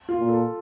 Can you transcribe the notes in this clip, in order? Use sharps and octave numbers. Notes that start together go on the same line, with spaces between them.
F4
A#2
A4